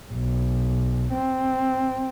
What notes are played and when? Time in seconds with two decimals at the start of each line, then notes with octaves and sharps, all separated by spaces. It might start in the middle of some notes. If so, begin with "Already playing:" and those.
0.12 B1
1.12 C4